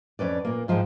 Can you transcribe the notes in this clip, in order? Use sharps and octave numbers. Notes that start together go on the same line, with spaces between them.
F2 C#4 B4 D5
A#2 A#3
G#2 F3 G#3 D#4 G5